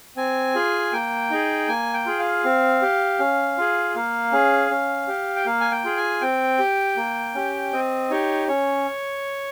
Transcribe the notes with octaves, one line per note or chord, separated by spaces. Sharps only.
C4 G#5
F4 G#4
A#3 G5
D#4 G#4
A#3 G#5
G5
F4 G#4
F5
C4
G4
C#4
F4 G#4
A#3 F5
C#4 G#4
C#4
G4
G5
A#3 F5
G#5
G5
F4 G#4
G#5
C4 G5
G4
A#3
C#4 G4
C4 D#5
D#4 G4 C#5
C#4 C#5